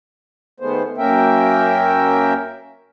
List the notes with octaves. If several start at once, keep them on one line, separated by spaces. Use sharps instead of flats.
D#3 G#3 A3 B3 C5
F#2 A#3 C#4 A#4 E5 G5